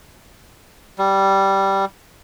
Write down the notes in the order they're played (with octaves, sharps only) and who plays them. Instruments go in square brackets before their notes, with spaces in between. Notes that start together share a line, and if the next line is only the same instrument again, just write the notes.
[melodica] G3